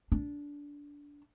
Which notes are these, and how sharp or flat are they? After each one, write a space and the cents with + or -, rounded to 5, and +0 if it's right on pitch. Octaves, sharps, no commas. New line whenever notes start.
D4 -20